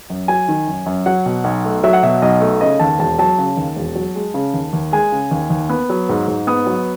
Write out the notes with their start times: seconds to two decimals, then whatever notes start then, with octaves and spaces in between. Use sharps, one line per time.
0.10 F#2
0.28 F#3 G#5
0.48 D#3
0.67 F#2
0.86 F#2
1.06 F#3 F#5
1.26 B2
1.44 B1
1.64 A3
1.84 F#3 E5
1.93 F#5
2.03 B2 E5
2.22 B1 D#5
2.41 A3
2.61 C#3 D#5
2.80 D#2 A5
2.99 E1 A5
3.18 F#3 A5
3.38 C#3
3.57 D#2
3.76 E1
3.95 F#3
4.15 G#3
4.34 C#3
4.53 D#2
4.73 D#2
4.92 G#3 G#5
5.12 C#3
5.31 D#2
5.50 D#2
5.69 B3
5.90 F#3
6.09 G#2
6.28 G#2
6.47 B3 D#6
6.66 F#3